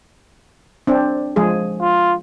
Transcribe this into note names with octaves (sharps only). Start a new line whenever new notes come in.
C4 D4
F3 G#3 G#4
F4